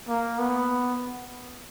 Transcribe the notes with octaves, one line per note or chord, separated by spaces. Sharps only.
A#3
B3